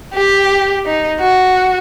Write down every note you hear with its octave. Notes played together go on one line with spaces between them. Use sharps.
G4
D#4
F#4